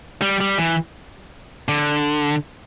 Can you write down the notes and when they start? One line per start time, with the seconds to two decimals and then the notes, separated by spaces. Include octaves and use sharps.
0.22 G3
0.41 G3
0.58 E3
1.68 D3